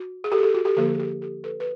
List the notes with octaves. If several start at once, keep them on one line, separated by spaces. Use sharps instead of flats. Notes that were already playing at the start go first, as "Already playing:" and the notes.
Already playing: F#4
G#4
G4 A4
G#4
G4 A4
F#4 G#4
G4 A4
D3 F3 A#3 G4 A4
G#4
G4 A4
G4 A4
A4 B4
B4